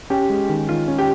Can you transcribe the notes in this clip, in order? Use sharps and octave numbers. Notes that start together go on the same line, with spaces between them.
C#4 G4
G#3
D#3
D#3 F4
C#4
G4